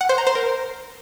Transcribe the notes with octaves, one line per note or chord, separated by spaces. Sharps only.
F#5
C5
A#5
C5
A#4